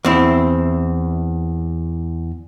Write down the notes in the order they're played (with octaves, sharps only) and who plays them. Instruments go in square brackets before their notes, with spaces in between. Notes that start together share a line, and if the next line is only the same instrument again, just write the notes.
[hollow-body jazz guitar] E2 C4 E4